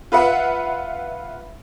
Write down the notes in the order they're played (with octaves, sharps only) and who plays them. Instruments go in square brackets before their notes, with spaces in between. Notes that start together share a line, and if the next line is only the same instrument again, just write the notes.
[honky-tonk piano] F4 B4 E5 F#5